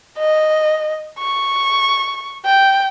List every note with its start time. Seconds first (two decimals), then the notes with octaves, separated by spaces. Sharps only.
0.18 D#5
1.19 C#6
2.45 G5